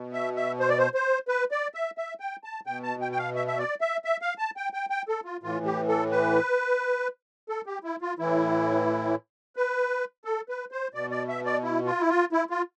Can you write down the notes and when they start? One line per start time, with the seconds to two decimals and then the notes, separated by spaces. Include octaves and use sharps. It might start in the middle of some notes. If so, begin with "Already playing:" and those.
Already playing: B2
0.13 E5
0.36 E5
0.60 C5
0.69 D5
0.78 C5
0.94 C5
1.28 B4
1.51 D5
1.74 E5
1.98 E5
2.20 G5
2.44 A5
2.66 B2 G5
2.83 A5
3.01 G5
3.12 G5
3.18 F5
3.36 E5
3.47 E5
3.59 D5
3.81 E5
4.05 E5
4.22 F5
4.38 A5
4.57 G5
4.74 G5
4.90 G5
5.08 A4
5.25 F4
5.43 A2 E3 F4
5.65 G4
5.88 A4
6.11 B4
7.49 A4
7.66 G4
7.84 E4
8.01 F4
8.19 A2 E3 E4
9.56 B4
10.25 A4
10.49 B4
10.72 C5
10.94 B2 D5
11.11 D5
11.28 E5
11.45 D5
11.63 E4
11.86 F4
12.00 E4
12.09 F4
12.32 E4
12.50 F4